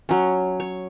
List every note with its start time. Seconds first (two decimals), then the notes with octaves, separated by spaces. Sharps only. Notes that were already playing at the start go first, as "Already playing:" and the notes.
0.09 F#3 C#4
0.60 C#5